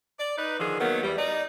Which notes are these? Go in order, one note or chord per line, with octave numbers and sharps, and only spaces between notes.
D5
D#4 B4
D3 D#3 F3 G#4
D#3 F#3 A#3 B3
E2 G3
D#4 D5